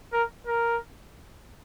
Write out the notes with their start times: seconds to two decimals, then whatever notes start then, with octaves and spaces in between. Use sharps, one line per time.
0.13 A#4
0.47 A#4